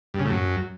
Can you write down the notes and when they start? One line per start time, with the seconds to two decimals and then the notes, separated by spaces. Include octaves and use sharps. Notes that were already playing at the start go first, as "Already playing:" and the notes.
0.14 G2
0.19 C#3
0.25 A2
0.30 F#2